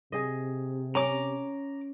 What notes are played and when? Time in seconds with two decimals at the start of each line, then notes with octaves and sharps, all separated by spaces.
0.12 C3 G#4 D#5
0.95 C#4 A#5 D6